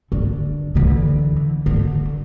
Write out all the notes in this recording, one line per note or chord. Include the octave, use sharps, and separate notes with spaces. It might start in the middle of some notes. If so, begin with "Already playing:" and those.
D3
D3 E3
D3